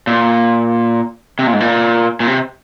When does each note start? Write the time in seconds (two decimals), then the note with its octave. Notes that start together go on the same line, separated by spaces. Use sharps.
0.07 A#2
1.39 C3
1.47 A#2
1.53 G#2
1.60 A#2
2.20 A#2
2.27 C3